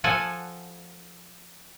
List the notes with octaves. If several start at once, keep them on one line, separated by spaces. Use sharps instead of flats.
F3 A4 F#5 G#5